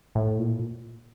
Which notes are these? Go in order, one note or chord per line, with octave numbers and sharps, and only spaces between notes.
A2
A#2